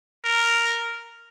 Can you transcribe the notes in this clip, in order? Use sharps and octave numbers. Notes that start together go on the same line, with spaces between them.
A#4